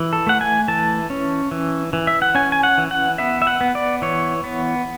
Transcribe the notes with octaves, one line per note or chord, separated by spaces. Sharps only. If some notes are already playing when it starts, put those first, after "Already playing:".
Already playing: E3
A4
A3 F#5
G#5
E3 A5
C#4
E3
E3
E5
F#5
C#4 G#5
G#5
F#5
E3
F#5
B3 E5
E5
F#5
B3
D5
E3 C#5
B3